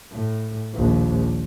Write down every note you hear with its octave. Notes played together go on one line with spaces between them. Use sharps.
A2
A#1 D#2